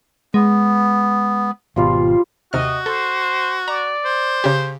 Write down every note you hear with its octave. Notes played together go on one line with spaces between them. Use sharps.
G#3 B3
G#1 B2 F3 G3 F4
D#2 C3 F#4 D#5 F6
A4 C5
D5 A#5
C5
C#3 G4